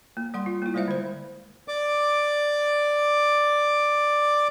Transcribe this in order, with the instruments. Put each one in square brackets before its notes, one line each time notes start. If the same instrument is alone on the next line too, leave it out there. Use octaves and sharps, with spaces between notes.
[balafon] A#3
G3 F#5 C6
F4
A#3 E4
G3 G#3 C5 D5 E5 F5
D3 C5
[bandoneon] D5 D6